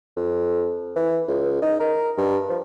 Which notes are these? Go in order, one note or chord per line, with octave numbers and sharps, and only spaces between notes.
F2
E3
C#2
D#4
A#4
G2
F3